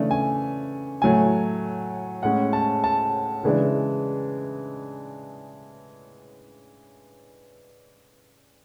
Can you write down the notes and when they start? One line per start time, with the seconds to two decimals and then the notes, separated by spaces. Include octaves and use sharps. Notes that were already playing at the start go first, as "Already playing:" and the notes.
Already playing: C#3 E3 A3 D4
0.11 G#5
1.02 A2 F#3 A3 G#5
2.23 A2 G#3 C#4 F#5
2.53 A5
2.84 A5
3.43 C#3 E3 G#3 D4